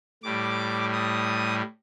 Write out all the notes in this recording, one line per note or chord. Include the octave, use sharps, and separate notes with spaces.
A2 G3 D6
D#6